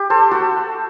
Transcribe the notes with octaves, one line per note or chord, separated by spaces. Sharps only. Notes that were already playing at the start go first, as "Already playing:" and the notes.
Already playing: G4
A4 C5
F#4 A4